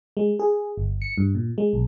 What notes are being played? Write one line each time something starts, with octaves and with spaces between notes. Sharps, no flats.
G#3
G#4
G1
C#7
G2
A#2
G#3
B1